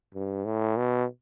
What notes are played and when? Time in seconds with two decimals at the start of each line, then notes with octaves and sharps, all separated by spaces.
0.15 G2
0.45 A2
0.77 B2